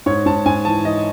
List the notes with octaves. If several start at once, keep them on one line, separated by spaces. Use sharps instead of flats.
G#2 C#5
G#2 A5
G#2 G#5
E3 A5
E3 D#5